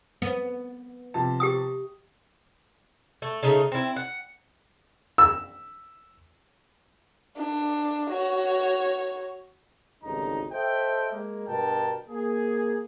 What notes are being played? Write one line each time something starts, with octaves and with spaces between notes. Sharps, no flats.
B3
C3 F3 A5
G4 G5 D#6
A3
C#3 A3 D#4
C4 E4
F#5
E6
D4
F#4 C#5
G#1 D2 G2 C#3 D#4 A#5
A4 C5 D#5 E5 G5
G#3 A#3
G2 B2 D3 A#4 G5 A5
A#3 G#4